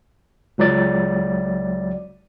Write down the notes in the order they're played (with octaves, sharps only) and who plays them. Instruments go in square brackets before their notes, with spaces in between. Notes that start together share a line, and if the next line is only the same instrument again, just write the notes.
[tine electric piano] C#2 F#3 D5